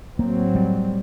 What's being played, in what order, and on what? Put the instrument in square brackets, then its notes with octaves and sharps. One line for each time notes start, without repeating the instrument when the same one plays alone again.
[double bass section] A2 F#3 C4 [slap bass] A#3
[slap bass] G3